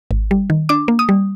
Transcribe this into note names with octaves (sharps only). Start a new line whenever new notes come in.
G#1
G3
D#3
D4 D6
A#3
D#6
G3